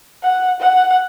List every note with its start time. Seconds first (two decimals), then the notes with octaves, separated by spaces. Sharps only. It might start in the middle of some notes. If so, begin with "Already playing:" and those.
0.23 F#5
0.60 F#5